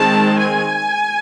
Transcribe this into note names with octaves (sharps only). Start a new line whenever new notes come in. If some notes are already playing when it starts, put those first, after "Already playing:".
Already playing: D#3 G#3 C4 A5
G#5